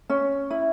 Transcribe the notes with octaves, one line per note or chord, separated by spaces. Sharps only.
C#4
E4